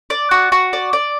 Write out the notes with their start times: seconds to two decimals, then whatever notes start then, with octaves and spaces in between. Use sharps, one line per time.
0.10 D5
0.31 F#4
0.52 F#4
0.73 D5
0.93 D5